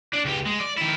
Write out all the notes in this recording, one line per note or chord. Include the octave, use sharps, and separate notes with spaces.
D4 D5
C#2 G4
G#3
D5
D#3 E4